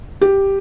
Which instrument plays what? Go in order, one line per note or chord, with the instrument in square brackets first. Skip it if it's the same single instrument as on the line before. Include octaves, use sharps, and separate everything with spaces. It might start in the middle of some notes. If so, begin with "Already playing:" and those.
[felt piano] G4